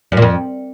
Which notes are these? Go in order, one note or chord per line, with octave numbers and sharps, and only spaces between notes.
F#2
A#2
F2